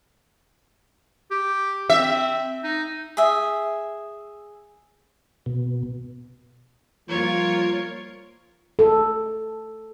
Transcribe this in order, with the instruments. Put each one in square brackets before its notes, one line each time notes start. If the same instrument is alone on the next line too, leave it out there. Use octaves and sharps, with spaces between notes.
[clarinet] G4
[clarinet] C4 [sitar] E5
[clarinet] D#4
[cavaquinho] G#4 E5
[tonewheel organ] B2
[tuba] F3 [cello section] G3 A#3 F4 [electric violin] A#4 C#5
[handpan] A4